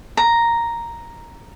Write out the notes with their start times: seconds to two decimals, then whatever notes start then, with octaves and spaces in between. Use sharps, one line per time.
0.17 A#5